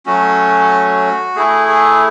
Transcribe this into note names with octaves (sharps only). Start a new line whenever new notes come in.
F#3 A3 C#4 F#4
A3 E4 G#4
G#4